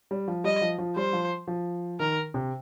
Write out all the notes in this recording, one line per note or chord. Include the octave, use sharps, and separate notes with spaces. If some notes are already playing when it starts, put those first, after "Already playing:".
G3
F3
G3 D#5
F3
F3
G3 C5
F3
F3
D#3 A#4
C3